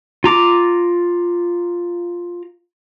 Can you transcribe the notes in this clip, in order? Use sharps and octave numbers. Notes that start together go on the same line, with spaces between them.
F4 A#5 D6